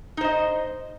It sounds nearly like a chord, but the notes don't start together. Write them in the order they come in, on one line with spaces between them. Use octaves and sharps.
D#4 C5 D#5